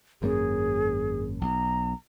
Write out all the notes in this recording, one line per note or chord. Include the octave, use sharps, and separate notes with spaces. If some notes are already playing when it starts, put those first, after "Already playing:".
G#1 F#2 A#3 C#4 G#4
B1 A#5